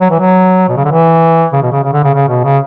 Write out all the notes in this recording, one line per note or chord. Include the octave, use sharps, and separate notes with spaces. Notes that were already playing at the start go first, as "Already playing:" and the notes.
F#3
E3
F#3
B2
C#3
D3
E3
C#3
B2
C#3
C#3
D3
C#3
C#3
B2
C#3